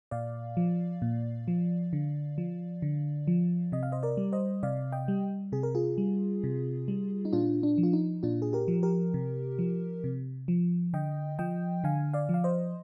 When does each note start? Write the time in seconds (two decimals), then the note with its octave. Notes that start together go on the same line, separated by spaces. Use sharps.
0.11 A#2 D5 F5
0.57 F3
1.02 A#2
1.48 F3
1.93 D3
2.38 F3
2.82 D3
3.27 F3
3.72 C3 D#5
3.83 F5
3.92 C5 D#5
4.03 A#4 D5
4.17 G3
4.32 C5 D#5
4.63 C3 D5 F5
4.92 D#5 G5
5.08 G3
5.52 C3 G#4
5.63 A#4
5.75 F4 G#4
5.98 G3
6.44 C3
6.88 G3
7.25 D#4
7.33 A#2 D4 F4
7.63 D4
7.78 F3
7.83 F4
7.93 D#4
8.23 A#2 D4 F4
8.42 G#4
8.53 G4 A#4
8.68 F3
8.83 G4 A#4
9.14 C3
9.59 F3
10.04 C3
10.48 F3
10.93 D3 D#5 G5
11.39 F3 D#5 G5
11.84 D3 F5 G#5
12.13 D5 F5
12.29 F3 F5
12.44 C5 D#5